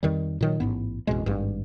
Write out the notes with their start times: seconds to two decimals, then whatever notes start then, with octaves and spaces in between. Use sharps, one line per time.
0.03 F2 D#3 G3
0.41 A#2 D#3 F#3
0.60 A1 G#2 B3
1.07 A1 F2 B2 G#3
1.26 G#1 G2